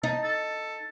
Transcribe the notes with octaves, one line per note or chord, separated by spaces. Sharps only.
D#4 A5
A4